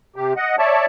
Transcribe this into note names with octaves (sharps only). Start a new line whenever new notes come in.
C3 G4
D#5 F#5
C#5 D5 E5 A5